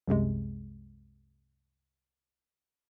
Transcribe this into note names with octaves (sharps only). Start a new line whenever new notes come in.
C2 F#2 C3 G#3